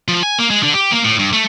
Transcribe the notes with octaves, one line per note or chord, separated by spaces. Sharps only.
F3
G#5
A#3
G#3
D3
G4
A#3
A2
G2
A3